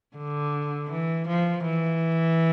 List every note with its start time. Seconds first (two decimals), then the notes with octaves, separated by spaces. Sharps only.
0.17 D3
0.90 E3
1.27 F3
1.64 E3